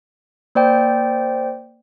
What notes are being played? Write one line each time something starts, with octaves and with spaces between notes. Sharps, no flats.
A#3 C5 D5 G5